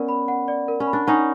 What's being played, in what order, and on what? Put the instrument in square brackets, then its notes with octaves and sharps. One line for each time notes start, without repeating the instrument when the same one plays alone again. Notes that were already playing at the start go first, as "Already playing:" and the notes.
Already playing: [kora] B3 C#4 [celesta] A#4 D5 F#5
[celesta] B5
F#5
D5
A#4
[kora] C#4
[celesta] B5
[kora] D4
[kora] C#4 D#4 [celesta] F#5